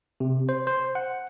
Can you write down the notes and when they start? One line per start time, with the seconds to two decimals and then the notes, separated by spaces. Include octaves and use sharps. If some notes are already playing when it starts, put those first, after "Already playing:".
0.20 C3
0.49 C5
0.67 C5
0.95 F#5